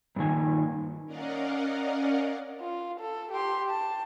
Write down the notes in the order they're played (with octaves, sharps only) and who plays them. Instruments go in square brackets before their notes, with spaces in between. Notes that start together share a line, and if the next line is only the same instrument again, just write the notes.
[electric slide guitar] G2 A#2 D#3 G#5
[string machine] C#4 A#4 D5 D#5 F5 F#5
[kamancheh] F4
A4
G4 C6
A5